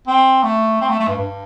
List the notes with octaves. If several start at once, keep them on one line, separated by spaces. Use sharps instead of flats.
C4
A3
C4
A3
A3
G2
G2